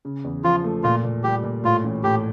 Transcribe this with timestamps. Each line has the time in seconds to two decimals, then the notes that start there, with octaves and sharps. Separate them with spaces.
0.05 C#3
0.24 E2
0.44 F3 F4
0.64 A3
0.84 A#2 F4
1.04 A#2
1.24 G3 G4
1.44 A#2
1.64 A2 F4
1.84 A1
2.03 A2 G4